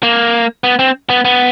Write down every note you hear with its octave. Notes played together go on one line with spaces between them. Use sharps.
A#3
B3
C4
B3
B3